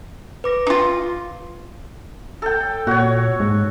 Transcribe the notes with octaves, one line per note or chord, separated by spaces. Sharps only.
B4 D6 A#6
D#4 F4
A4 G5
A#2 F#4 C#5
G#2